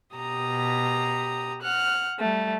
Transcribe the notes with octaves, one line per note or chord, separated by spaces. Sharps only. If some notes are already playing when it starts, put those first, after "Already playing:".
B2 G4 A#5 D#6
F#5 F6 F#6
G3 A3